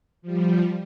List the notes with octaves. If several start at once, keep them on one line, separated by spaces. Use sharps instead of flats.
F3 G3